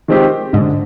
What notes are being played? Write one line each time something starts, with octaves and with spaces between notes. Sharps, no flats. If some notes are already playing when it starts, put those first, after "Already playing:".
D#3 G#3 C4 G4
G#2 D3